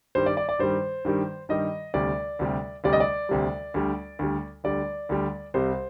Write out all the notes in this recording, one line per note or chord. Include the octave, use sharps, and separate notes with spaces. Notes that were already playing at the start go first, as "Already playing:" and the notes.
G2 D#3 G3 C5
D5
D5
D5
G2 D#3 G3 C5
G2 D#3 G3
G2 D#3 G3 D#5
D2 C3 G3 D5
D2 C3 G3
D2 C3 G3 D5
D#5
D5
D2 C3 G3
D2 D3 G3
D2 D3 G3
D2 D3 G3 D5
D2 D3 G3
C2 C3 G3 C5